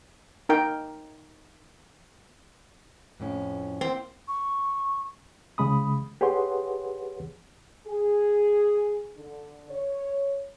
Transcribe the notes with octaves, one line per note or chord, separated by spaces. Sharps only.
D#4 A#4 G5
F2 A2 C#4
A#3 C4
C#6
C2 C#3 G#3 B5 D#6
G4 G#4 B4 C#5 F#5 C6
G#4
D3
C#5